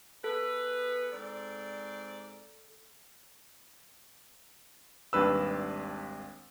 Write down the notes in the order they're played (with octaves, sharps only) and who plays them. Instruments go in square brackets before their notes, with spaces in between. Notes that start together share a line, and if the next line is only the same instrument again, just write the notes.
[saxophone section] B3 G#4 B4 [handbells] A4
[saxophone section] G#2 C4 D5
[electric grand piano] G#1 D#2 G3 D4 B4 E6